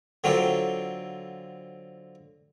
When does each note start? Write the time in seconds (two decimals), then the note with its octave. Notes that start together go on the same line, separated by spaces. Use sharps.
0.24 D3 F#3 C4 F4 G4 A4